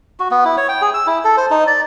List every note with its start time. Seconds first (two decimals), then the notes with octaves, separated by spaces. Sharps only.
0.20 F#4
0.31 B3
0.45 E4
0.57 C#5
0.69 G5
0.82 G#4
0.94 E6
1.07 E4
1.25 A4
1.37 C5
1.51 D#4
1.67 D5